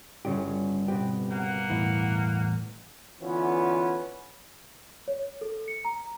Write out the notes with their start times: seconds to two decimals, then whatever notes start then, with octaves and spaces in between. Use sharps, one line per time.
0.25 G1 C#3 C#4 D4 G4 C#5
0.88 B2 C4 G4 B4
1.31 A#3 F#5
1.70 E2 A2 E3
3.21 D3 E3 B3 C#4 F4
5.08 C#5
5.41 A4
5.68 C#7
5.85 A#5